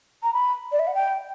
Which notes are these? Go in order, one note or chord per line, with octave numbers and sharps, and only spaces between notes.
A#5
B5
D5
E5
F#5
G5